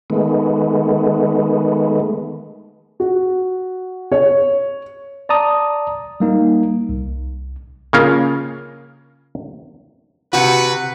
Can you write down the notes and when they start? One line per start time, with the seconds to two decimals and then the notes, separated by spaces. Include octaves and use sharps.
0.10 D#3 G#3 A3 B3
3.00 F#4
4.12 C#5
5.29 D5 A5 A#5 D#6
6.20 G3 A#3 D#4
6.89 C2
7.93 C#3 A#3 C#4 F4 A#4
10.33 C3 F#4 B4